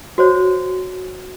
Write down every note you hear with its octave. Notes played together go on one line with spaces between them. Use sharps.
F#4 C5 C#5